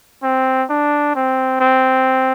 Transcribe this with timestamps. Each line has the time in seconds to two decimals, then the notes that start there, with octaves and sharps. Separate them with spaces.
0.23 C4
0.70 D4
1.15 C4
1.60 C4